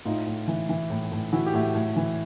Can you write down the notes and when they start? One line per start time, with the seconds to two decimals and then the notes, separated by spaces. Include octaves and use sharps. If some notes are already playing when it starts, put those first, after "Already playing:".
0.05 A2 D#4 F4
0.26 A2
0.48 E3
0.69 E3
0.90 A2
1.12 A2
1.32 E3 E4 F#4
1.46 G4
1.54 A2 E4 F#4
1.75 A2
1.96 E3